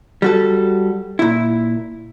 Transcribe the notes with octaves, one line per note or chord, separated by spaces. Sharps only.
G3 F#4 A4
A#2 E4